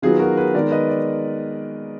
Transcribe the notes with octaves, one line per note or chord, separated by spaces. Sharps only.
D#3 F#3 B3 F4 G#4
F#4 A#4
G#4 B4
D#3 G#3 B3 A#4 D5
B4 D#5
D5